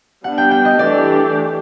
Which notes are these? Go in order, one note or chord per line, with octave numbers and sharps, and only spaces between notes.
G3 B3 D4 F#5
G5
G5
D#5
E3 A3 D4 G4 D5